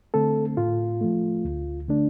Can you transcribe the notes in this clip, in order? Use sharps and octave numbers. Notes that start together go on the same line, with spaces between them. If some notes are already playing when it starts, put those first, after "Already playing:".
D3 A3 C4 A4
A2 F4
F3 A3
D2
D3 A3 D4